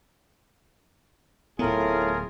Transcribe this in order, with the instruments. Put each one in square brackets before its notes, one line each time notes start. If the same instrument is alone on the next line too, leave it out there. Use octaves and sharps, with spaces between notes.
[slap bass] D1 B3 [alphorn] A2 [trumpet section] F4 G#4 [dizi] A#4